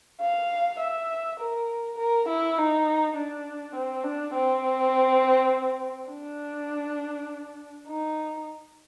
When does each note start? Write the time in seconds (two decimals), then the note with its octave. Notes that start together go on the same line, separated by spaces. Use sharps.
0.21 F5
0.80 E5
1.40 A#4
1.98 A#4
2.29 E4
2.58 D#4
3.17 D4
3.75 C4
4.04 D4
4.34 C4
6.10 D4
7.88 D#4